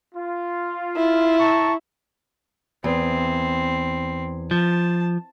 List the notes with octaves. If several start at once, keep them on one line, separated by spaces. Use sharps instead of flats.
F4
E4
A5 A#5 C#6
E2 C4
F3 A5